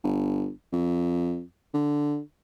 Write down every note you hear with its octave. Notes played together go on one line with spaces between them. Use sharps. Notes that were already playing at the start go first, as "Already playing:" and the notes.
G1
F2
D3